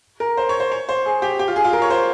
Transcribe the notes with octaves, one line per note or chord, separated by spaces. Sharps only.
A#4
C5
C#5
C5
C#5
C5
G#4
G4
G4
F4
G#4
F4
A#4
C#5
C5